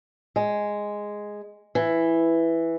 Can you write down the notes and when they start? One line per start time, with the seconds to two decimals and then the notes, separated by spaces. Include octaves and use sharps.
0.36 G#3
1.75 E3